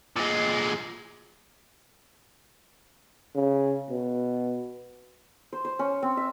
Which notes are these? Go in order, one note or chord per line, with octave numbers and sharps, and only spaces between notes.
A#2 G#3
C#3
B2
C5
C5
C#4
C4
E5